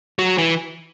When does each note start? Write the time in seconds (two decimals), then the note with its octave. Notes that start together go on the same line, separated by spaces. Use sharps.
0.19 F#3
0.38 E3